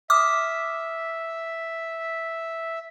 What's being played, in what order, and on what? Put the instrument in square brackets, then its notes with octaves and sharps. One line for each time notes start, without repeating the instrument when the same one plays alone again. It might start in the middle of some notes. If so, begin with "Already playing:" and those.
[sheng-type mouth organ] E5 [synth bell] D6 D#6 F6